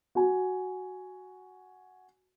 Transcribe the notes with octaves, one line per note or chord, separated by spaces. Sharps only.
F#4 G#5